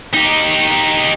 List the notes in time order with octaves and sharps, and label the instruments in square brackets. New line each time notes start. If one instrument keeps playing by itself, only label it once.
[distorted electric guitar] D#4 G4